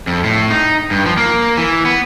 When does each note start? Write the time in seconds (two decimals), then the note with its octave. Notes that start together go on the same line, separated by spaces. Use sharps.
0.07 F2
0.24 A2
0.50 D#4
0.91 G2
1.06 F3
1.17 A#3
1.57 E3
1.85 B3